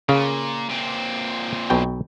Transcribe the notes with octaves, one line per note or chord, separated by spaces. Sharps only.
A#2 C#3 F5
A#2 C4
B1 B2 G5